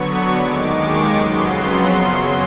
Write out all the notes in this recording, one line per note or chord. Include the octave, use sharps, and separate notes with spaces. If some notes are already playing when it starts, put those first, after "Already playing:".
Already playing: D3 F#3 B3 C#6
D#2 D#3 G#3 D6
C#6
F2 C#3 F#3 B3 C6
F#2 C#3 F#3 C6